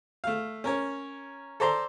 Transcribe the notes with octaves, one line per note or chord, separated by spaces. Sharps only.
A3 F5
C#4 A#4 C#5
A4 C5 D5 A#5 C6